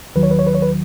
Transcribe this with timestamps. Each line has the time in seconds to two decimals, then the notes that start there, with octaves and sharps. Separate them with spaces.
0.15 D#2 D#3 F#3 B4
0.23 C#5
0.31 B4
0.39 C#5
0.47 B4
0.55 C#5
0.62 B4